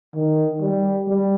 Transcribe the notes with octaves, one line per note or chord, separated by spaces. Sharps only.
D#3
G3
G3